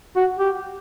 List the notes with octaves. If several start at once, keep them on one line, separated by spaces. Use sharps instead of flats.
F#4
G4